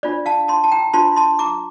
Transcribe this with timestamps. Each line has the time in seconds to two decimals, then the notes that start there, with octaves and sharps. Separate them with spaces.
0.03 D4 F4 C5 D5
0.26 F5 A5
0.48 A5 C6
0.64 A5
0.72 G5 A#5
0.93 D4 F4 C5 A5 C6
1.16 A5 C6
1.39 A#5 D6